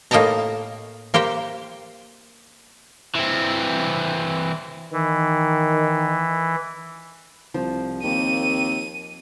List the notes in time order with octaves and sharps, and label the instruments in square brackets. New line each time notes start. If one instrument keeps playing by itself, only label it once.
[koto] A2 A#3 D#4 G5 A5 A#5
A#3 G4 C5 G5
[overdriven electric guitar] E3 C4
[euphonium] D#3 [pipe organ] E3
[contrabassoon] C2 [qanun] F3
[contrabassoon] D#2 [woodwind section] A#3 C4 [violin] D#7